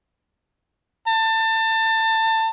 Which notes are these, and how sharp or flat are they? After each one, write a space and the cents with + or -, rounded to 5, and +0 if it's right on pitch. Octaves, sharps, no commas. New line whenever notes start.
A5 +25